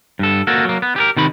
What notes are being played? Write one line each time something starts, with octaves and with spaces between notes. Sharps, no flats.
G2 A4
A#3 F#4 A4
F#3 A#3
B3
G4 G#4 A#4
C3 D#3 D#4 B5